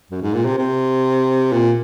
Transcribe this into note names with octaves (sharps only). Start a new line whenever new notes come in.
F#2
G#2
A#2
C3
C3
A#2